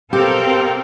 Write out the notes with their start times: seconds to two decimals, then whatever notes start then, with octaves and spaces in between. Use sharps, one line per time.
0.13 B2 C4 G4 A4 A#4 F5 G5